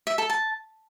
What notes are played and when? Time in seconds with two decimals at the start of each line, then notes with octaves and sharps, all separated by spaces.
0.07 E5
0.18 A4
0.30 A5